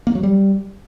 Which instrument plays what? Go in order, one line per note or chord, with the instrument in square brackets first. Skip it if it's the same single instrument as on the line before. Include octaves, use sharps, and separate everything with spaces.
[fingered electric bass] A#3
F#3
G3